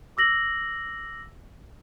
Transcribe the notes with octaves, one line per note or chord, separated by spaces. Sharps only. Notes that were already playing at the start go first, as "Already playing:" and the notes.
D6 E6 A#6 F#7